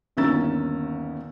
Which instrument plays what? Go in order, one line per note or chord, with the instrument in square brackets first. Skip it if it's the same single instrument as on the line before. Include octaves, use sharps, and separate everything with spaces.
[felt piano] G1 D#2 C#4 A#5 E6 A6